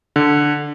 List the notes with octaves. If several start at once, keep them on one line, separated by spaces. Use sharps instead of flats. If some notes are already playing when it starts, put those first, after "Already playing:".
D3